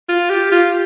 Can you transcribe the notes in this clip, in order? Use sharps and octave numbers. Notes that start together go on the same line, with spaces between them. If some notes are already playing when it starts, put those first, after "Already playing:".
F4
G4
F4